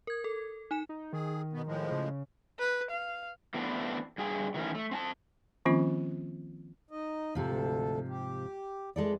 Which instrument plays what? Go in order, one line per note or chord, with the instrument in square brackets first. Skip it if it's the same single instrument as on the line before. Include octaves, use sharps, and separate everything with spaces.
[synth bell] A#4 G#6
A4
D#4 G#5 E7
[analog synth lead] D#4
[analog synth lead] D#3 [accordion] G#4
[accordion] B2 B3
A2 F3 G#3
[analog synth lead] C#3
[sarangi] B4
F5
[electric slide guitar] E3 A3 B3 C4 D4
G2 G#4 G5
D#3 E3 A3 C#4
A3
C4 G#5 A5
[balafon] D#3 F3 A#3 C4 C#4 F4
[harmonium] D#4 D#5
[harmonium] D2 A4 [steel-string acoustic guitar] G#2 C3 F3
[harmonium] G4
[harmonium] F2 E3 [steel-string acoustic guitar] G#3 A4 D5